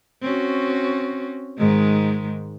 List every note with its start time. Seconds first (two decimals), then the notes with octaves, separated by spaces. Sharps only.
0.22 C4 C#4 F#4
1.58 G#2 D#3 G#3